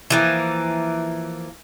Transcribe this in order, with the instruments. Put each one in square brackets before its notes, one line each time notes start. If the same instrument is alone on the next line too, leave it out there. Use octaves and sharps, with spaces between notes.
[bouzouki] E3 F3 A#3